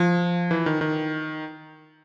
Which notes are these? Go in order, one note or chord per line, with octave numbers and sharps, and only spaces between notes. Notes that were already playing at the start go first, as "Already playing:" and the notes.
Already playing: F3
E3
D#3
D#3